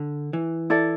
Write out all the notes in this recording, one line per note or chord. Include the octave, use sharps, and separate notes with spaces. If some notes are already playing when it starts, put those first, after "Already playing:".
Already playing: D3
E3
E4 A4 D5